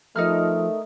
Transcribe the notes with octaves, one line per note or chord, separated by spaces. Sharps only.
F3 A3 D#4 A#4 F6